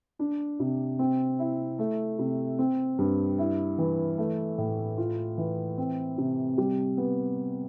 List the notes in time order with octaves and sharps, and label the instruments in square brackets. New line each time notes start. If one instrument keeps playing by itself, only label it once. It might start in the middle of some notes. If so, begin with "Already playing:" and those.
[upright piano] D4
C3
C4
E4
A3
C3
C4
G2
E4
E3
A3
A2
F4
E3
C4
C3
G3
B3